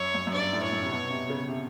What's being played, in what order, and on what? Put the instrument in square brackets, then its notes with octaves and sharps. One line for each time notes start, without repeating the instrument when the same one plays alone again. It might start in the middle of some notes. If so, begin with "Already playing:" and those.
Already playing: [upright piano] F#2 [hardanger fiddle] C#5
[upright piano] F#2
F#2
[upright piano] G2 [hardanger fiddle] D5
[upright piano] A2
[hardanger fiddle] C#5
[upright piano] F#2
C3
B2
C3
C#3
C3